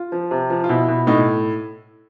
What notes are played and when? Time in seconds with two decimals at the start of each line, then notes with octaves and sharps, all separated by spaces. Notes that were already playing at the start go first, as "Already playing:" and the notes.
Already playing: F4
0.12 F3
0.31 C3
0.50 F3
0.64 F4
0.69 B2 E4
0.88 B2
1.07 A2 D#4